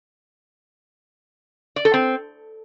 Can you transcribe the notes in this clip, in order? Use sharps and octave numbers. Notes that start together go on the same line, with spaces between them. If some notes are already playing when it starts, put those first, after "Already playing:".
D5
A4
C4